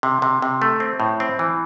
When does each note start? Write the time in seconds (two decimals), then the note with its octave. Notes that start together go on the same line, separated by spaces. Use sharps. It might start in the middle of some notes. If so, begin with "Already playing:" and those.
0.03 C3
0.22 C3
0.42 C3
0.62 A3
0.80 C4
1.00 A2
1.20 C4
1.39 E3